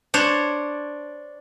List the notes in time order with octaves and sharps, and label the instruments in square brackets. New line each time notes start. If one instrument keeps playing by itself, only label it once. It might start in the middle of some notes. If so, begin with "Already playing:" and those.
[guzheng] D4 C5 C#5